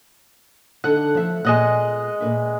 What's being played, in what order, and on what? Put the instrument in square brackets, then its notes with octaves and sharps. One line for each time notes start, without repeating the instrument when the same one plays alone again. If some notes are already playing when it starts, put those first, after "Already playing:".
[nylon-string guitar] D3 D#4 A4 [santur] F#5
[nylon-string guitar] F3 C5 E5
[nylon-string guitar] A#2 B3 [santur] G#3 D#5 F#5
[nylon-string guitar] A#2 B4 E5